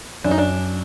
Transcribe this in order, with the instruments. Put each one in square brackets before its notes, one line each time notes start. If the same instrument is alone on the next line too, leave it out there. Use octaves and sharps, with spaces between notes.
[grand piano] F#2 [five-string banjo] D4
[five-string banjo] D#4
D4